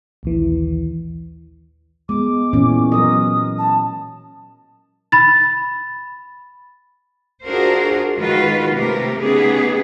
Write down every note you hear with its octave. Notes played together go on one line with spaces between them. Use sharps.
A#1 D#2 E3
G#3 B3 D6
A#2 E3 C#4
F#3 A#4 D#5 D#6
A5
B5 A6
D4 F4 F#4 G#4 A#4 C5
D#3 G#3 F4 F#4 B4
C3 A3 G4 A#4
C#3 A3 B3 D#4 G4 G#4